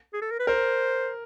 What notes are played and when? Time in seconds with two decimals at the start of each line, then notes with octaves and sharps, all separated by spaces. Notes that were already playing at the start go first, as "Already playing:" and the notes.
0.14 G#4
0.22 A4
0.31 A#4
0.39 B4
0.47 A#4 C5